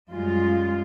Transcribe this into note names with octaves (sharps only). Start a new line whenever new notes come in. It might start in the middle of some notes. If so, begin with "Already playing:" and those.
F#2 G3 G#3 F4